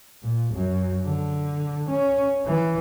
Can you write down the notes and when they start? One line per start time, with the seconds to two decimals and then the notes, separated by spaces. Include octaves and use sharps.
0.23 A#2
0.54 F#2
1.05 D3
1.90 C#4
2.46 E3